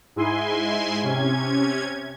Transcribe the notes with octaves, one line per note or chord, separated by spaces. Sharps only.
G#2 G#3 E4 G#5 C6
C3 C#4 G#6